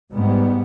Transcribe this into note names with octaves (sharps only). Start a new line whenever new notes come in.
G#2 G3 B3